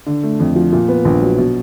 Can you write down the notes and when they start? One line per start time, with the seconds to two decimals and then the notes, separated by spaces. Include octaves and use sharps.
0.06 D3
0.23 A3
0.40 F2
0.56 F3
0.72 A#2
0.88 B3
1.05 A#1
1.22 F#3
1.38 B2